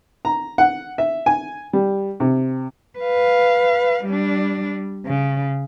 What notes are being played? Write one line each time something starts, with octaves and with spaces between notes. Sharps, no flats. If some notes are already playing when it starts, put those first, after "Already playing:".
A#5
F#5
E5
G#5
G3
C3
B4 F5
G3 D4
C#3